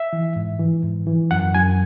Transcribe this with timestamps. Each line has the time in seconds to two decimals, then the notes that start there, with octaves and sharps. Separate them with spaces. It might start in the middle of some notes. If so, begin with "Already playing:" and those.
Already playing: E5
0.13 E3
0.36 G#2
0.59 E3
0.83 G#2
1.07 E3
1.31 F#2 F#5
1.55 F#2 G#5